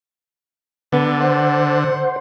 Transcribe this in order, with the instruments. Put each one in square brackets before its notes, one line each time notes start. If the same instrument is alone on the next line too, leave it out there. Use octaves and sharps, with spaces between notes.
[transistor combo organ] D3 [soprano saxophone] B3
[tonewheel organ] C5 [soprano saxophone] F#5